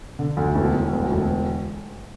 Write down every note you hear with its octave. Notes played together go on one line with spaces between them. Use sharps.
D3
D2
E1
E1
D2
E1